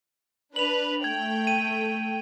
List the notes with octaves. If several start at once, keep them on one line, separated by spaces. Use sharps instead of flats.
D4 B4 F7 F#7
A3 G5 G#6
D#7